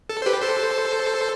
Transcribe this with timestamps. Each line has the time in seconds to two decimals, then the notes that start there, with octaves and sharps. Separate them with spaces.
0.10 A4
0.22 C5
0.26 G4 B4
0.42 A4 C5